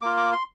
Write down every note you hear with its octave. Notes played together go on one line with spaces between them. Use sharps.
A#3 F4 D6
D6
C6